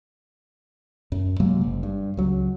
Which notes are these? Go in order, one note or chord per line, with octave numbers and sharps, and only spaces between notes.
F#2
C3 F#3 G#3 A#3
F#1
G2
C#2 F#3